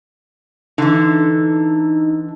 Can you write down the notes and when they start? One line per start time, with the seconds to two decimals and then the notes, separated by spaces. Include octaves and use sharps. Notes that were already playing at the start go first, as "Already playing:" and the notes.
0.78 D3 E3 D#4